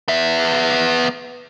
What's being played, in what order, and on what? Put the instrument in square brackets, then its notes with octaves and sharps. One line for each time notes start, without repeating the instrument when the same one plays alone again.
[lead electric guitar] B3 E5